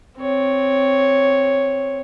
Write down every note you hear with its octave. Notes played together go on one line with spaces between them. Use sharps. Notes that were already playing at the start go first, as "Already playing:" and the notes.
C4 C#5